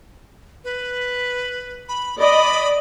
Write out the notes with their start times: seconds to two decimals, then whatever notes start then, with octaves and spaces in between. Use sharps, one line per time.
0.64 B4
1.89 B5
2.20 D5 D#5 B5